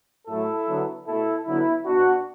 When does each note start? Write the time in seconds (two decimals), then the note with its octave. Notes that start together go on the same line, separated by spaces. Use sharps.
0.27 A2 F#3 A3 E4 A4
0.67 D3 F#3 B3
1.06 B2 A3 E4 A4
1.46 D3 F#3 B3 E4
1.85 B2 B3 D4 F#4